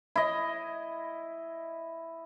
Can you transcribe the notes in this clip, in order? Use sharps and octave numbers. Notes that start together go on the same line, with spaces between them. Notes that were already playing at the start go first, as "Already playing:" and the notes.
E4 D#5